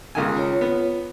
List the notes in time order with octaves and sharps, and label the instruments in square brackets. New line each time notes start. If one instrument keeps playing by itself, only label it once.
[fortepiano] C#2 D#3 G#5 [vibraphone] C#4
[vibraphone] F4 C#5
[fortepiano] B3